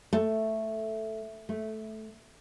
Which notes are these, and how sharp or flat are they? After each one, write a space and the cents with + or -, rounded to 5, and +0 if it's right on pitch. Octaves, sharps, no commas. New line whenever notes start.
A3 +0
A3 -10